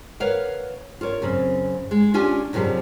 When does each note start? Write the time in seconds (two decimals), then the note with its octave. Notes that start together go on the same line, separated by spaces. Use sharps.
0.20 A#4 B4 C#5 F5 F#5
1.01 F4 A#4 C#5
1.22 F#2 C#3 C4
1.91 G#3
2.14 C#4 D4 F4 G4 G#5
2.53 F#2 C3 F3 G3 G#4